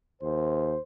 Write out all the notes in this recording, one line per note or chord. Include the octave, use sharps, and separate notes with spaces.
D#2 C5